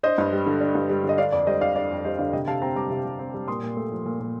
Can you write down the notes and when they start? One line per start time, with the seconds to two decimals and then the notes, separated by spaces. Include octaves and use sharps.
0.03 D4 C5 D#5
0.18 G2
0.32 G3
0.47 D3
0.61 D4
0.75 G2
0.89 G3
1.04 D3
1.09 D#5
1.18 D4 D5 F5
1.32 F2 D5
1.47 G3 C5 D#5
1.61 D3 D5 F5
1.76 D4 D5
1.90 F2
2.04 G3 C5 D#5
2.19 D3 D5 F5
2.33 C3 D#5 G5
2.47 C3 F5 A5
2.62 C4 G5 A#5
2.76 G3 A#5 D6
2.90 C3
3.05 C3
3.19 C4
3.34 G3
3.48 A#2 C6 D#6
3.63 A#2
3.77 A3
3.91 F3
4.05 A#2
4.20 A#2